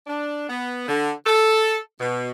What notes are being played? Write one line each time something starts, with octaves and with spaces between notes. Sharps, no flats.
D4
B3
D3
A4
B2